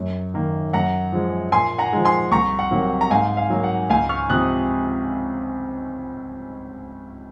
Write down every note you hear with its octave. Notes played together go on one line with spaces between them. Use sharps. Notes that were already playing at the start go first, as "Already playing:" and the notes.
Already playing: F#2
D#3 A#3
F#2 F#5 A#5
F3 G#3
A#2 G#5 C6
F#5 A#5
F3 G#3
G#5 C6
C2 A#5 C#6
F#5
C3 F#3 A#3
A#5
G#2 F5 G#5
F5
F#3 A#3
F#5
C#2 F5 G#5
C#6 F6
C3 F3 D#6 F#6